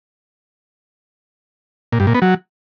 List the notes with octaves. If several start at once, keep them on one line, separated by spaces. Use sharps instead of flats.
A#2
G2
A#2
B3
F#3